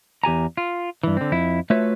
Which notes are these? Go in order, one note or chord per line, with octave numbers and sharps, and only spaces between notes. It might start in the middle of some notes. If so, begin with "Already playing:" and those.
E2 G4 G#5 A#5
F4
G2 E3
D3 C4
F2 E4
A3 F4 F#4 B4 C#5 E5